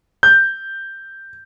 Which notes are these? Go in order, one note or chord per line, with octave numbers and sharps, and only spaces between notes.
G6